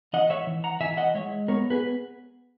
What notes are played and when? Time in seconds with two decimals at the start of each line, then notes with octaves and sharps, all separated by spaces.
0.13 E3 D#5 F#5
0.30 C#5 E5
0.47 E3
0.64 F#5 A#5
0.80 E3 E5 G#5
0.97 D#5 F#5
1.14 G#3 C#5 E5
1.48 B3 A#4 C#5
1.70 G#4 B4